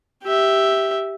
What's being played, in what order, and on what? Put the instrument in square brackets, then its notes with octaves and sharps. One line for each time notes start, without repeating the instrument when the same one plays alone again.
[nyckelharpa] G4 E5